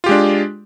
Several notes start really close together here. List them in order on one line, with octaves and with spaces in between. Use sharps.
F4 G4 G#3 D4